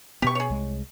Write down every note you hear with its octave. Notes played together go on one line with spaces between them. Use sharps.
B2 B3 G4 C#6
G#4 C#5
C2 G#3